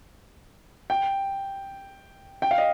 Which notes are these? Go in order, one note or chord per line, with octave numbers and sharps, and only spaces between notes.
G5
G5
F5
D#5